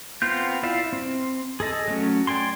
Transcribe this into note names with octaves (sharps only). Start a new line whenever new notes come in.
B3 C4 F4 G6
E4 F4 D5 E5 F5
C4
G#4 A4 D#5
F#3 A3 C#4
D5 G5 G#5 C6